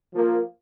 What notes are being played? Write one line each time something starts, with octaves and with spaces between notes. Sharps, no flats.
F3 A#3